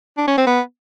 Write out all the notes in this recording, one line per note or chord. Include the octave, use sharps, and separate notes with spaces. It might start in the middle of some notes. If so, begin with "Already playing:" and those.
D4
C#4
C4
B3